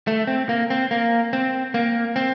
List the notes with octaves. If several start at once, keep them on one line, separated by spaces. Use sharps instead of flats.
A3
C4
A#3
C4
A#3
C4
A#3
C4